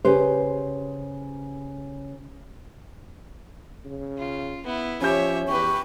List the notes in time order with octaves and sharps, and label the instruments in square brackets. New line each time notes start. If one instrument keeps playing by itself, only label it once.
[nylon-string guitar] C#3 G4 B4 C5
[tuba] C#3
[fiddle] F4
B3 E4
[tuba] F3 [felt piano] C#4 G6 [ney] G4 [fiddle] C#5 E5
[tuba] E2 [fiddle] G4 B4 [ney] C#6